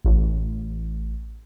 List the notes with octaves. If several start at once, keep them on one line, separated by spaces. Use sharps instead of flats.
A1